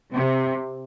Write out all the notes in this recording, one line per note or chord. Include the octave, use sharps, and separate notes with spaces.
C3